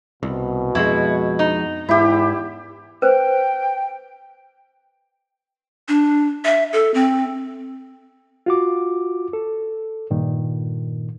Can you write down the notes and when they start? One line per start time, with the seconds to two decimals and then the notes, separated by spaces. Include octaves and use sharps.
0.23 C2 B2
0.75 F2 G#3 E4 F#4
1.39 D#4
1.89 E2 G#2 E4 G4
3.02 B4 C5 G5
5.88 D4
6.45 E5
6.73 A4
6.94 C4
8.46 F4 F#4 D6
9.33 A4
10.10 G2 A#2 D#3